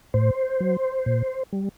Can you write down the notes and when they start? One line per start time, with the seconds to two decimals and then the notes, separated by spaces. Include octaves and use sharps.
0.14 A2 C5
0.60 F#3
1.06 A#2
1.53 G3